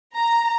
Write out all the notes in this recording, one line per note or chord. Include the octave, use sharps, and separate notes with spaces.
A#5